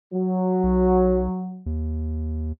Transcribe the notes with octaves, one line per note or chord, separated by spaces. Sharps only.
F#3
B1
D#2